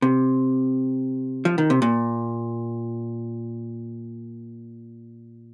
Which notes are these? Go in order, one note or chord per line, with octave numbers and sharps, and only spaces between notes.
C3
F3
D#3
C3
A#2